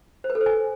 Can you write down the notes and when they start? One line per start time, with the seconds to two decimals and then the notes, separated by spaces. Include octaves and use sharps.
0.24 C5
0.30 B4
0.35 A4
0.41 C5
0.46 G#5